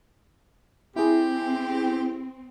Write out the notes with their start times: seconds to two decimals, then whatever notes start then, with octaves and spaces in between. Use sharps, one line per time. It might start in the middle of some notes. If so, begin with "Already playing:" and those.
0.96 C4 E4 G4 G#4